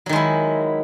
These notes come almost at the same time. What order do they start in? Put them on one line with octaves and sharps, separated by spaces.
F#3 D#3 G#3 E4